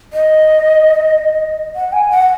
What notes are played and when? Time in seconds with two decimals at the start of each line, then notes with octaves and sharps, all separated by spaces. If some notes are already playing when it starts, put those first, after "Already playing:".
0.13 D#5
1.75 F#5
1.93 G#5
2.11 F#5